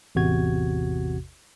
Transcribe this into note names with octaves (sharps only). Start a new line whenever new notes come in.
A1 E2 C3 F#4 G#6